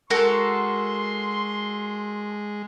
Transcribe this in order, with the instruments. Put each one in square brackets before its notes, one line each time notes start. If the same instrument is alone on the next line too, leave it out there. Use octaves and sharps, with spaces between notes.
[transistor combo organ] G#3 [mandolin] F#4 A4 A#4 [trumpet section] C6